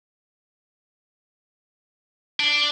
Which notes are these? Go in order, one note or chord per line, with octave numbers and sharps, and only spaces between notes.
D4